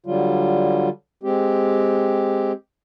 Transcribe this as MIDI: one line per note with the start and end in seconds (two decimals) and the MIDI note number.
0.06 0.89 50
0.06 0.89 54
0.06 0.89 55
0.06 0.89 65
1.23 2.52 56
1.23 2.52 60
1.23 2.52 67